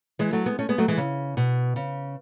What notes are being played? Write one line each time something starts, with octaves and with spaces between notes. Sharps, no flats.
E3 G#3
F#3 A3
G#3 B3
A3 C#4
G#3 B3
F#3 A3
E3 G#3
C#3
B2
C#3